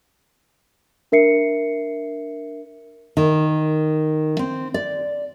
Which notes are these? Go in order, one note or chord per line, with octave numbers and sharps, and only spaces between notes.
D4 A#4 E5 C7 C#7
D#3
C4
D5